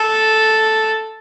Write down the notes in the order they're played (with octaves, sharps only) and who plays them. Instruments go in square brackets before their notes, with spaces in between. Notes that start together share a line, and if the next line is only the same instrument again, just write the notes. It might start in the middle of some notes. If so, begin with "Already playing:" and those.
Already playing: [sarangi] A4